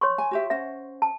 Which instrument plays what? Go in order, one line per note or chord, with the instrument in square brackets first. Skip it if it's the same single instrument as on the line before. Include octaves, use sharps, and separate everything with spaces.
[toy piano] C#5 C6 C#6
[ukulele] G#5
F#4 G4 E5
[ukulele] C#4 C5 F#5 [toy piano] E5
[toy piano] A5